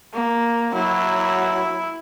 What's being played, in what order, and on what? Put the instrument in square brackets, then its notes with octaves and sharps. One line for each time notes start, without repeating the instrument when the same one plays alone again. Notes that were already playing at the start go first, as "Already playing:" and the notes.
[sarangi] A#3
[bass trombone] F#3 [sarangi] E4